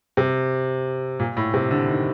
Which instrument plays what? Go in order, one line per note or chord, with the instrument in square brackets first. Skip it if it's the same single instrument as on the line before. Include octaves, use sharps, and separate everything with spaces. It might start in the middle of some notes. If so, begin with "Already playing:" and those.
[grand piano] C3
A#2
A2
C3
D3
D#3